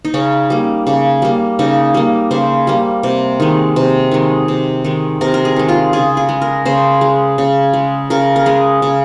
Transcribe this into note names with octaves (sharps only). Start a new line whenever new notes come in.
D#4
C#3 C#4
G3 A#3
C#3
G3 A#3
C#3 D#4
G3 A#3
C#3 C5
G3 A#3
C3
D#3 G#3
C3
D#3 G#3
C3
D#3 G#3
C3 A#4
A#4
G#4
D#3 G#3
F4
C#3 G#4
G#4
G#3
A#4
C#3 C5
G#3
C#3
G#3
C#3 A#4
A#4
G#3 G#4
C#3